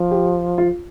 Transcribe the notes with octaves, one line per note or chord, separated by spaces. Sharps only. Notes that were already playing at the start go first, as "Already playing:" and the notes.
Already playing: F3
G4
F4